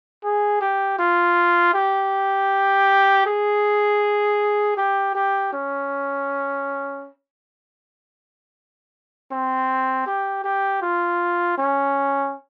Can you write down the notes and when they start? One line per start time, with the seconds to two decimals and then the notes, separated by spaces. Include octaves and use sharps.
0.24 G#4
0.61 G4
0.99 F4
1.74 G4
3.26 G#4
4.77 G4
5.15 G4
5.53 C#4
9.31 C4
10.07 G4
10.44 G4
10.82 F4
11.58 C#4